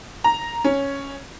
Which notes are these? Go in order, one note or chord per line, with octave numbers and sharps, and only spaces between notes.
A#5
C#4